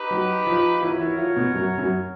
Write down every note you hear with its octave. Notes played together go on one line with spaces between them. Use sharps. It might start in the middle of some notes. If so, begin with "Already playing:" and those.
Already playing: D#4 G4 B4
F#3 F#4
F3 F4
F4
E3 E4 F#4 A#4 C#5
E3 E4
F3 F4
B2 B3
F#2 F#3
F#2 F#3